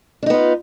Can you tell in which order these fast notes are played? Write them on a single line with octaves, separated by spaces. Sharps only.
D4 D#4 B3 F4